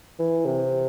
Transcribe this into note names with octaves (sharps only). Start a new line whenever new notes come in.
E3
C3